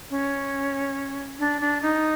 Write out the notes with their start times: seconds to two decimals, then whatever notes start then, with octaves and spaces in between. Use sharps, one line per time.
0.10 C#4
1.39 D4
1.61 D4
1.82 D#4